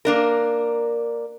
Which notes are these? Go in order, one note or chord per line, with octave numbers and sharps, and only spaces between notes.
A#3 D4 A#4